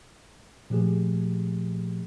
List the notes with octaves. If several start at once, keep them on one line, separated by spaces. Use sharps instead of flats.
A#2 F3 A3 G4 G#4